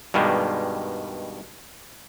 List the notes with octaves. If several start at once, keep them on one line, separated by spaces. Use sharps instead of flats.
G2 B2 D#3 G3 G#3